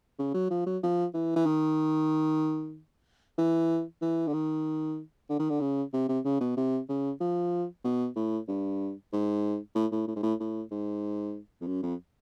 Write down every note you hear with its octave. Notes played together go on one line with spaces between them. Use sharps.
C#3
F#3
F3
F#3
F3
E3
E3
D#3
E3
E3
D3
D#3
D3
D#3
D3
C#3
C3
C3
C#3
B2
C3
C#3
F3
B2
A2
G2
G#2
A2
A2
A2
G#2
A2
A2
G#2
F2
F#2
F2